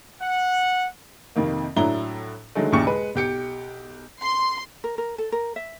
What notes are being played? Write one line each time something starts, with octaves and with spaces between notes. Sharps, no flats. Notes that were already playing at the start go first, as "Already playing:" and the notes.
F#5
F2 C3 D#3 A#3
A2 F#3 D4 E4 A#5 G7
D3 D#3 F#3 G#3 A3
D#2 A#2 C#3 E4 C#6 C#7
G#3 B4
B1 G4 C#7
C6
A#4
A#4
A4
A#4
E5